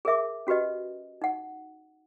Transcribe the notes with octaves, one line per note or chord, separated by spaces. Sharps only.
G#4 A#4 E5 D6
C#4 F#4 G4 B4 D#5
D#4 F#5